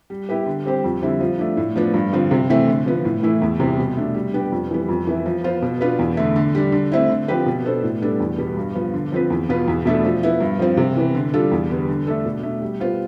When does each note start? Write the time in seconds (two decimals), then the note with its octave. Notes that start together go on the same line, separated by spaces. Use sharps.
0.10 G3
0.29 B3 E4 G4 B4
0.46 D3
0.65 G3 C4 G4 C5
0.84 F2
1.02 D3 G3 C4 E4
1.20 F3
1.38 A3 D4
1.57 A2
1.76 F3 B3 D4
1.94 G2
2.13 D3 F3 C4
2.31 C3
2.50 E3 A3 C4
2.68 D3
2.86 F3 B3
3.05 A2
3.23 E3 A3 E4
3.42 E2
3.60 C3 E3 G3
3.78 B2
3.97 A3 D4
4.14 G3
4.34 B3 D4 G4
4.52 F2
4.71 E3 G3 B3
4.89 F2
5.07 E3 B3 E4
5.26 F3
5.44 B3 F4 C5
5.62 B2
5.81 B3 D4 F4 B4
5.99 E2
6.17 D3 A3
6.36 D3
6.55 G3 D4
6.72 D3
6.92 A3 C4 E4
7.09 D3
7.28 F3 C4 G4 B4
7.46 B2
7.65 B3 D4 A4 C5
7.83 A2
8.02 G3 B3 D4 A4
8.20 E2
8.38 B2 G3 B3
8.57 G2
8.75 F3 B3
8.94 D3
9.12 F3 C4 F4 B4
9.30 E2
9.49 B2 B3 F4 B4
9.68 E2
9.85 B2 A3 D4 A4
10.04 F3
10.23 B3 E4
10.41 G2
10.59 F3 C4
10.77 C3
10.97 E3 B3
11.15 D3
11.33 G3 D4 F4 A4
11.52 E2
11.70 D3 G3 B3
11.89 D3
12.07 A3 D4 A4
12.25 B2
12.43 A3 D4
12.62 G3
12.80 B3 F4 C5